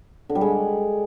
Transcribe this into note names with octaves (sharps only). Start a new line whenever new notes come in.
D3
G3
G#3